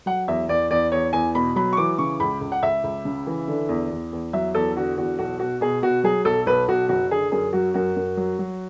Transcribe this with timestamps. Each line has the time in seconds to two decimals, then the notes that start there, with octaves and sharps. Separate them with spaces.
0.06 F#3 F#5
0.28 E2 E5
0.49 E2 D5
0.70 E2 D5
0.92 E2 C#5
1.13 E2 G#5
1.35 B2 B5
1.56 F#3 B5
1.73 C#6
1.77 E3 D6
1.98 C#3 C#6
2.20 C#2 B5
2.41 C#2
2.52 F#5
2.63 C#2 E5
2.84 C#2
3.05 C#3
3.27 E3
3.48 D3
3.69 E2
3.91 E2
4.12 E2
4.33 F#3 E5
4.55 E2 A4
4.76 D3 F#4
4.97 E2 F#4
5.19 B1 F#4
5.40 B2 F#4
5.61 B2 G#4
5.82 B2 F#4
6.03 F#3 G#4
6.25 B1 A4
6.46 B1 B4
6.68 B1 F#4
6.89 F#1 F#4
7.11 D3 G#4
7.32 F#2 G#4
7.53 F#3 F#4
7.74 F#2 F#4
7.96 F#2
8.17 F#3
8.39 F#3